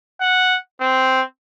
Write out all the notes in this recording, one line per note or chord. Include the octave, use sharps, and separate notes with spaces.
F#5
C4